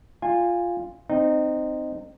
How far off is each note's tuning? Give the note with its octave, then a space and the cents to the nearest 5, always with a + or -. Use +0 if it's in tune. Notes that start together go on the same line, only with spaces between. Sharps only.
F4 +0 G#5 -25
C4 -15 D#4 -20